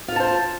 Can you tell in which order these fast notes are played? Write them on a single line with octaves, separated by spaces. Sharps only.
F4 A4 A5 C5